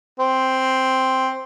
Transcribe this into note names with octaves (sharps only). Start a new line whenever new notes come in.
C4